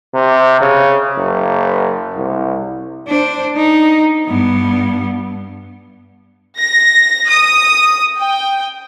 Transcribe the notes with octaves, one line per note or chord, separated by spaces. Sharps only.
C3
C#3
F#1
C2
D4 C5
D#4
G2 B3
A#6
D#6
G5